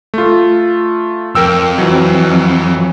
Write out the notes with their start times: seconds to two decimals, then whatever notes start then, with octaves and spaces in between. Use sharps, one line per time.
0.14 A3 F4
1.35 F2 A#4 G5 E6
1.78 E3 F#3